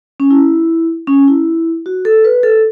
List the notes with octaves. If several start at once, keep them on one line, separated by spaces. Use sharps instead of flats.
C#4
E4
C#4
E4
F#4
A4
B4
A4